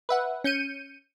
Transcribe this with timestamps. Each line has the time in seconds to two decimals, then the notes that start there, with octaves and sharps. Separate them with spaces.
0.09 B4 E5 F#5
0.44 C#4 G6 C#7 D#7